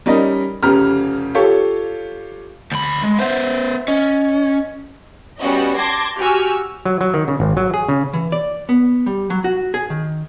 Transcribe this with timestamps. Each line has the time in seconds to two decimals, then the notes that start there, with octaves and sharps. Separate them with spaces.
0.06 G3 C#4 D#4 A#4 D5 D#5
0.63 F1 C#3 C#4 G4 A#5 F6
1.35 F4 G4 A4 C#5
2.72 D2 B5
3.04 G#3
3.19 B3 C5 E5 F#5
3.88 C#4 D#5
5.40 G3 B3 C#4 F#4 D#5
5.76 A5 C6 D6 G#6 A#6
6.19 F#4 G4 G#5 C#6 E6 F6
6.85 F#3
7.01 F#3
7.14 D#3
7.28 C#3
7.40 G#1
7.57 F#3
7.74 G#4
7.89 C#3
8.13 E3
8.32 D5
8.69 B3
9.06 G3
9.30 F#3
9.44 F#4
9.74 G#4
9.90 D#3